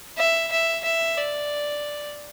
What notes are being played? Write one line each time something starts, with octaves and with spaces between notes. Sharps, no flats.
E5
E5
E5
D5